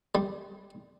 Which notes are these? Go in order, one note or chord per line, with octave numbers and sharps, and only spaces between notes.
G3